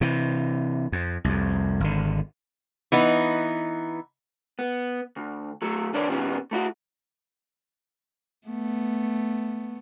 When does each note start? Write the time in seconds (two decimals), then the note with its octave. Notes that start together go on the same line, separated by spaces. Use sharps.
0.01 C3 E3
0.92 F2
1.24 C2 F2
1.80 G#1 D3
2.92 E3 B3 D#4
4.59 B3
5.16 D2
5.62 F#3 A3
5.93 D#3 D4 B4 C#5 D5
6.08 A#2 D#3 G3 B3 C#4
6.51 A3 E4 F#4
8.48 A3 B3